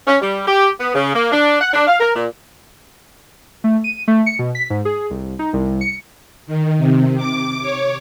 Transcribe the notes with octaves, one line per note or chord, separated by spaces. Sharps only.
C#4
G3
G4
B3
C#3
A#3
D4
F#5
D4
F5
A#4
A#2
A3
D#7
A3
C#7
B2
B6
G#2
G#4
C2
D#4
C2
C#7
D#3
C3
D6
C#5